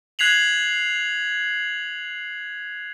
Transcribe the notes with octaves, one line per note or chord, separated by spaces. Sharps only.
F#6 G#6 B6 C7 F7 F#7